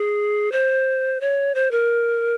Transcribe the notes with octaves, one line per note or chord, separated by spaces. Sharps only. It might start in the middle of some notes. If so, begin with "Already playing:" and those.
Already playing: G#4
C5
C#5
C5
A#4